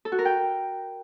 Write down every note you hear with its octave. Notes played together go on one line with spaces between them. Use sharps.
A4
F#4
A#4
G5